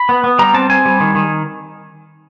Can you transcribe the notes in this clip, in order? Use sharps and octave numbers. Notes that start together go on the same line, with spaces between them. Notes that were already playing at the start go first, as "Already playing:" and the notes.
Already playing: B5
B3
B3
G3 A#5
C4 A5
C4 G#5
G3
D#3
D#3